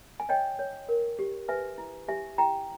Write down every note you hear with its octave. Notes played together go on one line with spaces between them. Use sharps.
G#5
C#5 D#5 G5
C#5
A#4
G4
B4 E5 G#5
E4
G4 E5 G#5
E4 G5 A#5